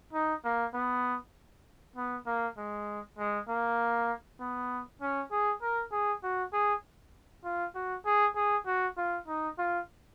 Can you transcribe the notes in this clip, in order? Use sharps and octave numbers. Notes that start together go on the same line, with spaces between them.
D#4
A#3
B3
B3
A#3
G#3
G#3
A#3
B3
C#4
G#4
A#4
G#4
F#4
G#4
F4
F#4
G#4
G#4
F#4
F4
D#4
F4